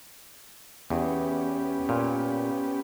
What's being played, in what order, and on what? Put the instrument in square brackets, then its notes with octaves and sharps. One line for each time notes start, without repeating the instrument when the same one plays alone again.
[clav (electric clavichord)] E2 [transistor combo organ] B3 C#4 G4
[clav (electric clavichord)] A#2